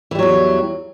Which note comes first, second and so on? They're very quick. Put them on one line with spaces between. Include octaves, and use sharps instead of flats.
E3 G3 F#3 E2